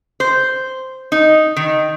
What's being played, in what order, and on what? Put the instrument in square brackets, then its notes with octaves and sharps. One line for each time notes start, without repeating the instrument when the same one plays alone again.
[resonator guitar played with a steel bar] C5
D#4
D#3